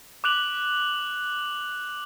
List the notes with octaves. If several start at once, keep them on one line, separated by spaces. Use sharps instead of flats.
D6 F#6 F7 F#7